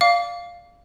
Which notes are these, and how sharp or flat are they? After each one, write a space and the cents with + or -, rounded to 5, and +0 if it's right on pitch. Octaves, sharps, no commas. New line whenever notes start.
D5 +0 F5 +0 D6 -30